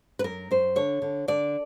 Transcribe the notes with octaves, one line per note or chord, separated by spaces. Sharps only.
B4
F#2 A#4
F#2 C5
D3 C#5
D3
D3 D5